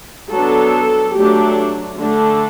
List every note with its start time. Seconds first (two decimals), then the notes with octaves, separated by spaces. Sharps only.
0.32 F#3 B3 D4 A4
1.15 F#3 A3 D4 G4
1.97 D3 A3 D4